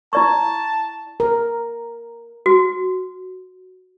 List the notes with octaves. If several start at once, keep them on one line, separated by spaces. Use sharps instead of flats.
E4 D5 A5 C#6
A#4
F#4